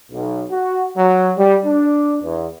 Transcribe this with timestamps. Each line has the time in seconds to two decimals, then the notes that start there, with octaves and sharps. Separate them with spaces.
0.12 B1
0.51 F#4
0.97 F#3
1.38 G3
1.66 D4
2.22 E2